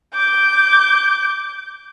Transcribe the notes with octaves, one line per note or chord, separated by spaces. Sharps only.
D6 G6